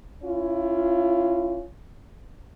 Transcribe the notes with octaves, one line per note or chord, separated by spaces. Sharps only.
C#4 E4 F4